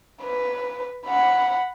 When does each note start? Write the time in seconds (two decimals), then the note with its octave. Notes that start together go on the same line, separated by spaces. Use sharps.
0.22 B4
1.06 F#5 B5